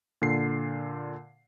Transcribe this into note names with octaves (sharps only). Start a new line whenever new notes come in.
A#2 D3 C7